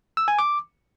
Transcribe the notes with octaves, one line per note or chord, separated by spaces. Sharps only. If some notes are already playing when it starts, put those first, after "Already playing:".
E6
G#5
D6